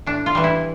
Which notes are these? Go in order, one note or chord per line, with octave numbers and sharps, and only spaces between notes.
A2 D4
F4
E3 G3
E4